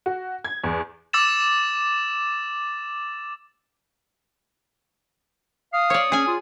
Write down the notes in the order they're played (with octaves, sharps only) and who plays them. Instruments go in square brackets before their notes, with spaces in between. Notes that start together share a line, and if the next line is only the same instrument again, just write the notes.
[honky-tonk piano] F#4
G#6
E2
[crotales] D6 E6 A6 E7
[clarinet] F5 [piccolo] D#6
[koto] C#5 D5
[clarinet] C#4 [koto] G#4 G#5
[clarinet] F4